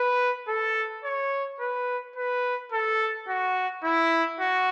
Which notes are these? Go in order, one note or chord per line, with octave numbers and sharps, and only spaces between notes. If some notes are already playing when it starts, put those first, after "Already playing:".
Already playing: B4
A4
C#5
B4
B4
A4
F#4
E4
F#4